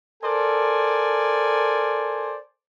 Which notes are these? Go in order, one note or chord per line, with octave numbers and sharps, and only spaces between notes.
A4 A#4 C5 D5 G#5